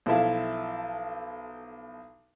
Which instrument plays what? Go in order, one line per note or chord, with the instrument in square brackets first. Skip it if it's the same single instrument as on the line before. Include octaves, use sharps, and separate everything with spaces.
[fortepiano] B1 F3 E4 A4 E5 F5